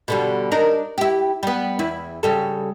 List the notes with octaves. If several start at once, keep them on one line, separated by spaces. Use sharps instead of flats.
B2 D3 G3
D4 D#4 A#4
E4 G4
G3 B3
E2 E4
C#3 G3 A4